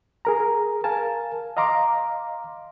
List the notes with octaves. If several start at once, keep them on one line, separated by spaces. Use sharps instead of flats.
G#4 A#4 A#5
A#4 F5 G#5 A5
D#5 F5 A#5 C6 D6